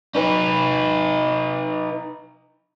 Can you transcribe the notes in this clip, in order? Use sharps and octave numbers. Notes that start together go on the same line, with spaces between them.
D#4 B4